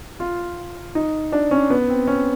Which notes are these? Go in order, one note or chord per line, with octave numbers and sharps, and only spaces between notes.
F4
D#4
D4
C#4
B3
C4
C#4